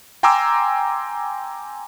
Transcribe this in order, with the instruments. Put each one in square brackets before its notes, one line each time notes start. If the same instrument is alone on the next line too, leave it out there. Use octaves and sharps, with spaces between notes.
[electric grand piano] G5 G#5 A#5 C6 D6 E6